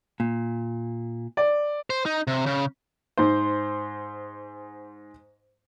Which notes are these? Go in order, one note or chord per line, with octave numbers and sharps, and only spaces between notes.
A#2
D5
C5
D#4
C3
C#3
G#2 C5